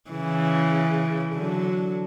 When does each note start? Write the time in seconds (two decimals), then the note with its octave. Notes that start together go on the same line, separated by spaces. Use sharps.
0.11 C#3 E3
1.35 D3 F#3